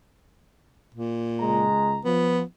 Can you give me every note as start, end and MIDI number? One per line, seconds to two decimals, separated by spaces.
0.95 1.67 46
1.41 1.99 37
1.41 1.99 56
1.41 1.99 82
2.05 2.41 53
2.05 2.41 59